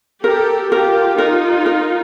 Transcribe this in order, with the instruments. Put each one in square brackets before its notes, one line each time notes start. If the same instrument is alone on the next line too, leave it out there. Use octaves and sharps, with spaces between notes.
[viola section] G4 A4 [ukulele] A#4
[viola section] F4 G4 [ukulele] A#4
[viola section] D#4 F4 [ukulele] A#4
[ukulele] A#4